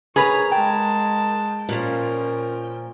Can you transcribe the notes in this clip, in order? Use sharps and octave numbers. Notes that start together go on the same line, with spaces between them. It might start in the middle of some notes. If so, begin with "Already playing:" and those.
G#4 A#4 B4 C#5 A#5
G#3 G5 A5
A#2 F3 C#4 A#4